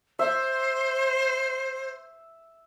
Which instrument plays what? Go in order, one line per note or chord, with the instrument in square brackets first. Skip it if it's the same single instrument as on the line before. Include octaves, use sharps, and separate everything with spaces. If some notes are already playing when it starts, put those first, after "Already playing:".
[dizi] C5 [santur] E5